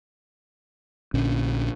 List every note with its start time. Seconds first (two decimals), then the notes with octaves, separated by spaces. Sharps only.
1.14 A#1 A#2 D3 C#4